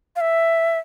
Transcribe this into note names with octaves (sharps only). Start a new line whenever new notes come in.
F5
E5